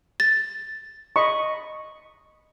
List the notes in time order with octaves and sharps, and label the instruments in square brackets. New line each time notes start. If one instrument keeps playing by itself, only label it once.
[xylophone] A6
[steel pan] D#5 B5 C#6